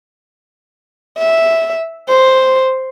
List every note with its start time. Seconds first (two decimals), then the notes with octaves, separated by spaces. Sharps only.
1.18 E5
2.09 C5